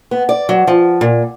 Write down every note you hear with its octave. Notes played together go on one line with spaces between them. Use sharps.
B3
D5
F#3
F3
A#2